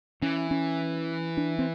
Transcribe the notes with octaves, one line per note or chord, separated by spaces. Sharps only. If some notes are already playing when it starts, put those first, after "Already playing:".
E3 C#4
C#4
D4
C4